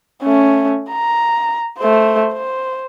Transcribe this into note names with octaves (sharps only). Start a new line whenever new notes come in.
A3 C#4
A#5
A3 C5
C5